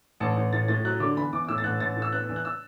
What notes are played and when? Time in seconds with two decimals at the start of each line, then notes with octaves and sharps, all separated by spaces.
0.20 A1 A5
0.37 A1
0.53 A2 A6
0.68 A2 A6
0.84 F#3 F#6
1.00 D3 D6
1.16 E2 B5
1.33 E2 D6
1.45 D6
1.49 A2 E6
1.58 A6
1.64 A1 F#6
1.80 A1 A6
1.96 A2
2.02 E6
2.13 B3 F#6
2.29 E2
2.36 F#6
2.45 E6